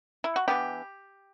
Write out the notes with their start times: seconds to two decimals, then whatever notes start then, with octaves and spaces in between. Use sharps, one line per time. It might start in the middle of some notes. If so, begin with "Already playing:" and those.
0.24 E4
0.36 F#4
0.48 E3 B3 D4 E4 G4